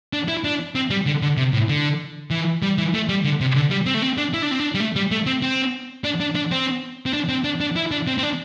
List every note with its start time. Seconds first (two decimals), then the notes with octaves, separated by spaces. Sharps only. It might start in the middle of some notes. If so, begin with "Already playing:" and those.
0.13 D4
0.28 E4
0.44 D4
0.75 C4
0.90 G3
1.06 D3
1.22 D3
1.37 C3
1.53 A2
1.69 D3
2.31 E3
2.63 G3
2.78 E3
2.94 A3
3.09 G3
3.24 D3
3.41 C3
3.55 D3
3.71 G3
3.86 C4
3.94 A3
4.02 C4
4.18 D4
4.34 E4
4.42 D4
4.51 C4
4.60 D4
4.75 G3
4.80 A3
4.96 G3
5.11 A3
5.26 C4
5.42 C4
6.04 D4
6.20 D4
6.35 D4
6.51 C4
7.06 C4
7.13 D4
7.29 C4
7.44 D4
7.61 D4
7.76 E4
7.91 D4
8.07 C4
8.18 C4
8.23 D4